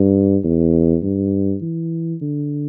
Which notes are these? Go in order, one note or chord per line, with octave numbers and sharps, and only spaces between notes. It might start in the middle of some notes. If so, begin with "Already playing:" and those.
Already playing: G2
E2
G2
E3
D3